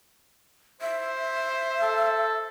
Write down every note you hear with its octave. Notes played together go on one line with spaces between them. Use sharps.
C5 E5
A4